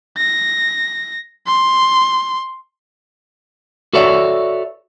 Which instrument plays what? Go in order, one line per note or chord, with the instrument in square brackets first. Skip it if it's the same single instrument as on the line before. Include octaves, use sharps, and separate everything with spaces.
[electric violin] A#6
C6
[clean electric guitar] F#4 A4 B4 C#5 D5 E5